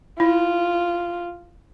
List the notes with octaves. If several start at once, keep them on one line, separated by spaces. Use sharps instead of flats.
E4 F4